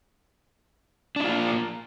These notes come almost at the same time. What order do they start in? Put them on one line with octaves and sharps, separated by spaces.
D4 E4 F4 A#3